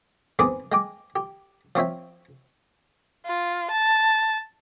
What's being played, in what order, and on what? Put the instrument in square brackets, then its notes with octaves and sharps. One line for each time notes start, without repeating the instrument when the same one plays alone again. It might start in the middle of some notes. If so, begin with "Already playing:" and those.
[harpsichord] E2 G#2 C4 G#4 B4 D6
G#3 G5 D6
G4
F3 C4 C#5 E5 G5
[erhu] F4
A5